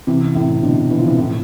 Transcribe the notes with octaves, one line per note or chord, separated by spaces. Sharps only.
C3 E3
A2 C3
B2 D3
E3
F3
C3 E3
A2 C3